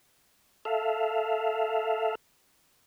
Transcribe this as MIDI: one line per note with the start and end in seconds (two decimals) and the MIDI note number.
0.65 2.15 69
0.65 2.15 76
0.65 2.15 77